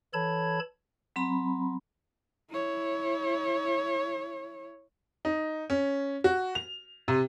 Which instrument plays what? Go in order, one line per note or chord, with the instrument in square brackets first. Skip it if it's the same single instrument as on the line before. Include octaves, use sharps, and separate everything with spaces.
[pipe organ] E3 A4 C#5 A5 B5 G#6
[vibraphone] F#3 C4 A#5 B5
[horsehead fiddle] E4 C#5
[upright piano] D#4
C#4
F#4
F7
C3